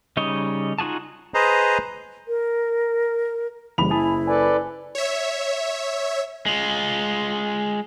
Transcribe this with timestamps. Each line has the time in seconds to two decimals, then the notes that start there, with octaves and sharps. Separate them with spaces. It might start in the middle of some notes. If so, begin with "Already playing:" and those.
0.17 C#3 G3 D#4 C#5 D#5
0.79 D#4 F4 F#4 G#4 A5
1.34 G#4 B4 C5 D#5 A#5
2.28 A#4
3.78 F#1 E3 G3 B5 F7
3.91 E4 G#5 A5 D#6
4.27 A4 B4 D5 G#5
4.95 C#5 E5
6.46 G#3 F4